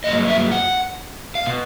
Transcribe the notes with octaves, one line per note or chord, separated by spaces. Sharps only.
G2 D#3 F#3 A#3 D#5
E5
F#5
F5
B2